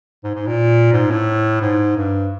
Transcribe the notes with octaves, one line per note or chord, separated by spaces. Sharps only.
G#2
G#2
A#2
G#2
A2
G#2
G2